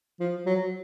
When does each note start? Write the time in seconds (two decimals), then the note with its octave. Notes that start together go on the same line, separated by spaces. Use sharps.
0.20 F3
0.46 F#3